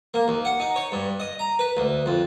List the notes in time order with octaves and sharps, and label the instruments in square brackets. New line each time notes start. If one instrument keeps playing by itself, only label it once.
[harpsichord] A#3
D#2
F#5
D#4
C#5
G2
D#5
A#5
B4
D2
F2